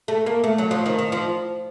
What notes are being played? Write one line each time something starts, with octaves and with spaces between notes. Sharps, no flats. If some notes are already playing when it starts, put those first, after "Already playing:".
A3
A#3
A3
F#3
F3
D#3
D#3
F3